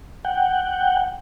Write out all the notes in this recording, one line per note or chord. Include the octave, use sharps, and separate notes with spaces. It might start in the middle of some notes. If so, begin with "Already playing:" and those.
F#5 G5